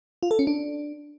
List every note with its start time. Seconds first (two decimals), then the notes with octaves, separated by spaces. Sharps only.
0.23 F4
0.31 A4
0.39 C#4
0.47 D4